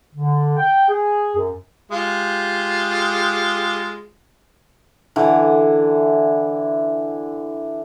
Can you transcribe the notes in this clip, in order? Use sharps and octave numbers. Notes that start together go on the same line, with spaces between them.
D3
G5
G#4
F#2
G#3 F4 G4
D3 E3